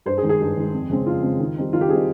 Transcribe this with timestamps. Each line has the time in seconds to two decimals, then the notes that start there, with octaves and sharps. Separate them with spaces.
0.06 G2 C5
0.17 G#4
0.23 D#3 G#3
0.29 G#4
0.40 G2
0.57 D#3 G#3
0.73 F2
0.90 C#3 G#3 C4
1.06 F2 F4
1.23 C#3 G#3 C4
1.39 D#3
1.57 G3 C4 D#4
1.73 D#3 F4
1.81 G4
1.89 G3 G#4
1.92 C4 D#4